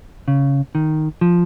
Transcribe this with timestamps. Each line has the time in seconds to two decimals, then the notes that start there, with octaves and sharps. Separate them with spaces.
0.28 C#3
0.75 D#3
1.21 F3